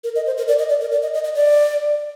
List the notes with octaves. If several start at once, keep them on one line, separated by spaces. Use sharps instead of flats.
A#4
D#5
C5
A#4
D5
D#5
D5
A#4
D5
D#5
D#5
D#5
D5